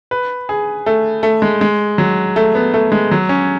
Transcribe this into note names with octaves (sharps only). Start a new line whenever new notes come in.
B4
G#4
A3
A3
G#3
G#3
F#3
A3
B3
A3
G#3
F#3
C#4